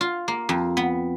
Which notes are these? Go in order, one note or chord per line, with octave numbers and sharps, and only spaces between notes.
F4
A#3
F2
B3